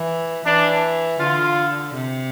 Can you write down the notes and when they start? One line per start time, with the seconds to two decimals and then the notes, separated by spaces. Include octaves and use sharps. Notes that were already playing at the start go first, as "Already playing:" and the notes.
Already playing: E3
0.44 E3 D4
1.19 D3 F4
1.94 C3